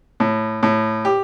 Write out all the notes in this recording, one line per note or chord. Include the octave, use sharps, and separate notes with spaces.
A2
A2
G4